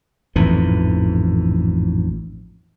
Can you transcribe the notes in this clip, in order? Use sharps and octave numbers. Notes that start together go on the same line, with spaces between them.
A1 F2 G#2 E3